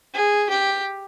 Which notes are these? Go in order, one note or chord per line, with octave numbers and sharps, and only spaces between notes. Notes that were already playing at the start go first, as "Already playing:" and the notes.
G#4
G4